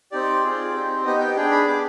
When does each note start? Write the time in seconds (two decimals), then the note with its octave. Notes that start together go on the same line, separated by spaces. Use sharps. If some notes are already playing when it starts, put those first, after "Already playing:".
0.12 C4 D#4 G4 D5
0.43 C4 F4 G#4
0.74 C4 D#4 G4
1.05 B3 D#4 G4 D#5
1.20 G5
1.36 D4 G#4 G5
1.51 B5
1.67 B3 D4 G#4 D6